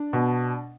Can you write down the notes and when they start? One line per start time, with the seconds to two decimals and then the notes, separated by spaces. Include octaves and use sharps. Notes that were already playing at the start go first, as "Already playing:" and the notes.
Already playing: D4
0.13 B2